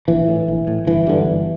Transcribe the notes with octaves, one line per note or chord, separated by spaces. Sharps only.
A#1 E3
A2
A#1
A2
G1 E3
G2 D3
G1